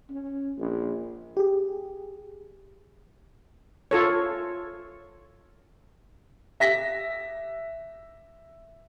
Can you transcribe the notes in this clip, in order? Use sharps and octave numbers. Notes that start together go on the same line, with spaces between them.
C#4
A#1
G4 G#4
F4 A4 C#5
E5 A#6 B6